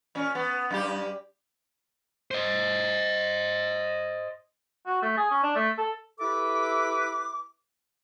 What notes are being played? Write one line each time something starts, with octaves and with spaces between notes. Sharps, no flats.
A#2 C#4
B3
F#2 G3 G4
C5 D#5
F#4
A3
G#4
C#4
D4
A3
A4
E4 G4 A4 B4 E5 D6